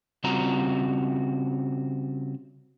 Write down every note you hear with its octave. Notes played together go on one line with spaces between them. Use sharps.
C#3 G3 C4 F4 F#4 A#5